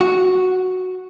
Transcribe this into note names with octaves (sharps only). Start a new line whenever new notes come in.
F#4